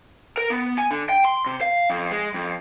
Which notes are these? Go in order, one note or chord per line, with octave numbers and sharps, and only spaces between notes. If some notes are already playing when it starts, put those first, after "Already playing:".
A#4
B3
G#5
D3
G5
C6
C3
F5
F2
G#3
F2